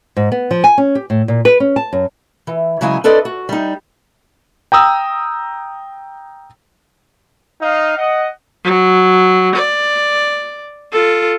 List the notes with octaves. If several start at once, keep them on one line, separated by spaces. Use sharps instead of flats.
G#2
B3
F3
G#5
C#4
G4
A2
A#2
B4
C#4
A5
F#2
E3
C#3 F#3 G#3 E4 G#5 A#5
D4 A4 B4 C5 D5 D#5
F#4
G3 D#4
G5 A#5 D#6 E6
D#4 D#5 F5
D#5 F#5
F#3
D5
F4 A4